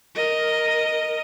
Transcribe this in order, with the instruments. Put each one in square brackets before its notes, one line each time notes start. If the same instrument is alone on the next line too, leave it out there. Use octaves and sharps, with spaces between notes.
[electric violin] A#4 D#5